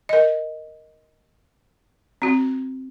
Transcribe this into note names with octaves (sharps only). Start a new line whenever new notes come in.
A#4 D#5
C4 F#4